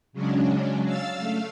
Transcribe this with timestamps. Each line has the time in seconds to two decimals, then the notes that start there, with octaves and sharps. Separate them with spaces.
0.13 C#3 F#3 G#3 C#4 D4
0.86 F5 E6 A6
1.18 A3 F5